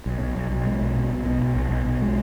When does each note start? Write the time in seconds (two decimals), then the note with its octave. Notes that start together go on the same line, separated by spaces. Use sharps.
0.06 B1
0.20 B1
0.36 B1
0.51 B1
0.66 G#3
0.81 B1
0.95 B2
1.11 B1
1.25 B2
1.41 B1
1.56 B1
1.71 B1
1.86 B1
2.02 G#3